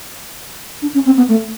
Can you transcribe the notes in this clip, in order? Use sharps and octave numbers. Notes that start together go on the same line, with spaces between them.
D4
C#4
C4
B3
A3